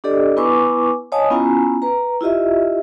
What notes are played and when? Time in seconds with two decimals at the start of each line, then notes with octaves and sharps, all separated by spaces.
0.04 D4 G4 A4 D5 D#5
0.37 B3 E4 B4 G#5 C#6 D6
1.12 C#5 D#5 F5 G#5 A5 D#6
1.30 B3 C#4 E4 F4 G#5 A#5
1.82 B4 A#5
2.21 E4 F4 G4 D#5 E5